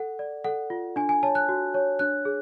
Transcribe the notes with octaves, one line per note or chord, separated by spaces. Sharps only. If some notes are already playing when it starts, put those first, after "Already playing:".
Already playing: A4 F#5
D5
A4 F#5
F4
D4 G#5
G#5
C#5 A5
F#6
F#4
C#5
D4 F#6
G#4